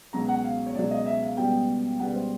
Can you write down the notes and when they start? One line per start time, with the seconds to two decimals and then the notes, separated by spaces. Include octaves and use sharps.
0.13 C#2 B2 F#3 A#5
0.28 F#5
0.44 F5
0.66 C#5
0.75 C#2 B2 F#3 D5
0.91 D#5
1.06 E5
1.22 F5
1.37 C#2 B2 G3 B3 G5
1.99 C#2 B2 G3 B3 F#5
2.07 B4
2.15 C5